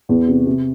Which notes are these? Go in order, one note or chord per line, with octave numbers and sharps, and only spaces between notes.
E2
C3
C3